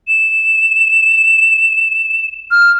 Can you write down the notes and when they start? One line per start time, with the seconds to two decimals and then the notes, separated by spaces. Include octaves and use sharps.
0.08 E7
2.51 F6